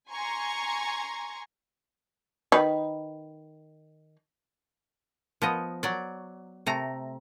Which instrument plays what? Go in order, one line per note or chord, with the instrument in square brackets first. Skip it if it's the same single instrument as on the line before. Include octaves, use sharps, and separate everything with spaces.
[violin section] G#5 A#5 C6 C#6 G#6
[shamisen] D#3 B4
[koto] F3 B3 D#5
F#3 D5
C3 A3 A#5